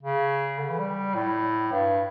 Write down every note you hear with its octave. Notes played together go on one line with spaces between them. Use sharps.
C#3
D3
E3
G3
A2
G2